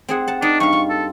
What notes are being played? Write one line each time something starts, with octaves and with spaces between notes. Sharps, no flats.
C4 G#4 F#5
F#5 A5
D4 D#4
G2 F5 C#6
F4
A4